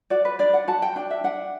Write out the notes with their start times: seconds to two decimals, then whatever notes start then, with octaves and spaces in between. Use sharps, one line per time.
0.10 F#4 D5
0.25 B4
0.39 D4 D5
0.54 F#5
0.68 F#4 A5
0.82 G5
0.96 D4 G5
1.11 E5
1.24 D4 F#5